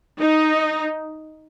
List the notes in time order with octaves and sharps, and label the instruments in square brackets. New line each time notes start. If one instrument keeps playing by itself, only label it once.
[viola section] D#4